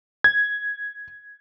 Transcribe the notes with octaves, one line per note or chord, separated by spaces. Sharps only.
G#6